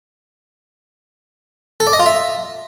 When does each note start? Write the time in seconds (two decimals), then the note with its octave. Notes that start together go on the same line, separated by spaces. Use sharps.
1.80 A4
1.87 D5
1.93 D#5
1.99 F4
2.06 E5